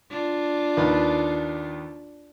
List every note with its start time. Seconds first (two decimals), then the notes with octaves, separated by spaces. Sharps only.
0.10 D4 F4
0.77 D#2 D#4 B4